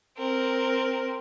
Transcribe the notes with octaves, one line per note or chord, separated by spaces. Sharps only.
C4 A#4